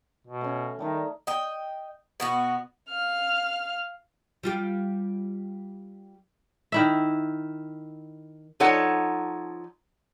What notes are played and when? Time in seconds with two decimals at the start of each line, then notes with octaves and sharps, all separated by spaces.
0.27 B2
0.41 A3 C#4
0.79 D#3 G3 A3 D#4
1.27 D#5 G5
2.20 B2 B3 F#4
2.89 F5 F6
4.43 G3 F4 G4
6.72 D#3 E4 E5
8.60 F3 D#4 A4 C#5 F#5